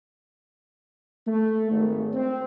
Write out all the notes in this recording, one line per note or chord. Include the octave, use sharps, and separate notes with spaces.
A3
G#1
C4